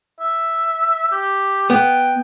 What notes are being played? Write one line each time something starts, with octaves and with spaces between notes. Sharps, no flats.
E5
G4
B3 G5